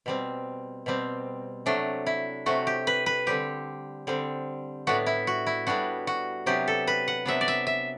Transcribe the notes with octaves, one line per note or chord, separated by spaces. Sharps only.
B2 G3 C4
B2 G3 C4
C3 F#3 A3 D4
E4
C3 F#3 A3 F#4
G4
B4
B4
D3 G3 C4 G4
D3 G3 C4
A2 G3 B3 D4 F#4
E4
F#4
E4
A2 G3 B3 D4 F#4
F#4
C3 F#3 B3 D4 G4
A4
B4
F#5
C3 F#3 B3 D4 E5
D5
E5
E5